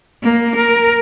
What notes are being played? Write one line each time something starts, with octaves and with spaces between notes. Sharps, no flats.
A#3
A#4